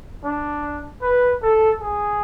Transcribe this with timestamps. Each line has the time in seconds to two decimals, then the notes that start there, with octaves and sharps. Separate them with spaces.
0.24 D4
1.02 B4
1.42 A4
1.81 G#4